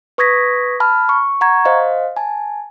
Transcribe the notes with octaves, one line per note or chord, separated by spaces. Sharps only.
B4 C#6 D#6 G#6 A#6 B6
A5 B5 F6
C#6
F#5 A#5 C#6 G#6
C5 D#5 F5
G#5 A5